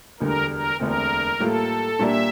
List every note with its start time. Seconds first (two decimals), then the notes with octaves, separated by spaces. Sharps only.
0.20 E1 D2 D3 G3 A#4
0.50 A#4
0.79 E1 D2 D3 A3 C4 A#4
1.40 A2 G3 A#3 F4 A4
1.99 A#2 G3 A#3 D4 E5